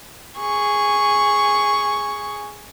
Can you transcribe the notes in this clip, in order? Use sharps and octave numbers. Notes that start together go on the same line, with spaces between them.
G#4 C#6